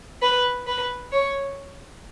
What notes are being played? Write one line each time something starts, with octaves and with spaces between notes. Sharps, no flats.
B4
B4
C#5